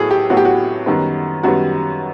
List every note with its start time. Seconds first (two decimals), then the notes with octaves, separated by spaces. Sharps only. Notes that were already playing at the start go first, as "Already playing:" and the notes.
Already playing: A2 F#3 B3 G#4 A4
0.11 G4
0.30 A2 F#3 B3 F#4
0.37 G4
0.45 F#4
0.86 F#2 D#3 G3 B3
1.43 F#2 D#3 G3 B3 F#4